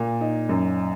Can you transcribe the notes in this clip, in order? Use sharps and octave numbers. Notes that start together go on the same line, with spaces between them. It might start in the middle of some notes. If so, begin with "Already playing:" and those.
Already playing: A#2
D#4
F#2